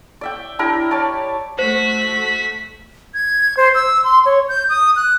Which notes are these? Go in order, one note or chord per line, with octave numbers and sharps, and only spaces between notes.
D5 E5 G5
D4 E4 G4 A#4
C#5 D5 A5
A3 F#4 C5 B6
G#6
C5
E6
C6
C#5
G6
D#6
F#6